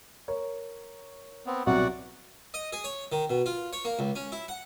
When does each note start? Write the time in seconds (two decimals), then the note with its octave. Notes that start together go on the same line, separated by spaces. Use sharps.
0.28 A#4 C#5
1.46 B3 C4
1.67 C2 B2 F#3 F#4 D5 F#5
2.54 D#5
2.73 G#4
2.84 C#5
3.12 D#3
3.30 B2
3.46 F4
3.73 C#5
3.85 A#3
3.99 C#2
4.16 C#4
4.32 E4
4.48 F#5